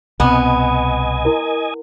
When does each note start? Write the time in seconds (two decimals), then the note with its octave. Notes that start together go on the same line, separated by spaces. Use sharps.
0.20 C2 B2 B3 C4 D#5 G#5
1.25 E4 A#4